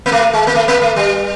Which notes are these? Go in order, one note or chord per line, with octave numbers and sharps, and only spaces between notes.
A#3
A3
G#3
A#3
A3
A#3
A3
G3